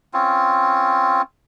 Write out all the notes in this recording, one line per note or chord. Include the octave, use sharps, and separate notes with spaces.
C4 C#4 F4